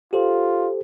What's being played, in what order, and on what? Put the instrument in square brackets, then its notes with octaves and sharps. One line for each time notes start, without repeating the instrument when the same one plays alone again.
[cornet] F4 [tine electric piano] G4 A4 C5